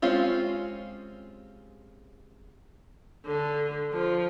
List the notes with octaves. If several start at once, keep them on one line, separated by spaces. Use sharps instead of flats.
G#3 C4 C#4 F4 G4
D3
F3